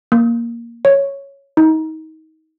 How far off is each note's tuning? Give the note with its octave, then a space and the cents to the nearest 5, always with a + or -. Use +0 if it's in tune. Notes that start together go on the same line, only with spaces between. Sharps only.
A#3 +5
C#5 +0
D#4 +30